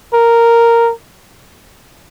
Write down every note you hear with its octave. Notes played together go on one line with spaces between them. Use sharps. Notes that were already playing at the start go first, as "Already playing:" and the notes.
A#4